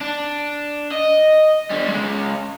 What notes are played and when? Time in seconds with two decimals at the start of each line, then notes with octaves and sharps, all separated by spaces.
0.01 D4
0.91 D#5
1.70 D3 G3
1.88 C#3 G#3